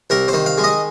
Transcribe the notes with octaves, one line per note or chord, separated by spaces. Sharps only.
C2 A#4
C5
D#3
F5
G#3
D#5